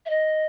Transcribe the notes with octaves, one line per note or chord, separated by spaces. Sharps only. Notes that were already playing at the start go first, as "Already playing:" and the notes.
E5
D#5